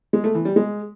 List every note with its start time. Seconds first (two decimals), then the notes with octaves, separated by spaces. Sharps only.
0.13 G#3
0.24 A3
0.35 E3
0.45 G3
0.56 G#3